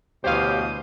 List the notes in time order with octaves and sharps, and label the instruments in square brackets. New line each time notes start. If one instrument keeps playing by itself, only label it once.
[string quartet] D2 E3 D#6 [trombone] B2 [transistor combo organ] G4 [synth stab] C5 C#5 F5